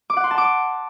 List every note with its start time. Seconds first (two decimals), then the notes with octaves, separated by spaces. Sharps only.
0.10 D6
0.17 F#5
0.24 C6
0.31 A5
0.38 D6